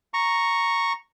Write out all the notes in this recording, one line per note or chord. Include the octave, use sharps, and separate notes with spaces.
A#5 C#6